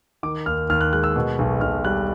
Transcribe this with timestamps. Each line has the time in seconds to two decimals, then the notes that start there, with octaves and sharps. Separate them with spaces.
0.23 D#3 D6
0.46 D#2 F6
0.70 D#2 F6
0.81 F#6
0.93 G#3 F#6
1.04 E6
1.16 B2
1.39 B1
1.61 B1 F6
1.85 G3 F#6